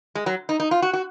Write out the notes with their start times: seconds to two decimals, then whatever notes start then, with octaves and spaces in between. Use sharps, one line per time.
0.15 G#3
0.26 F#3
0.49 D#4
0.60 D#4
0.71 F4
0.82 F#4
0.93 F#4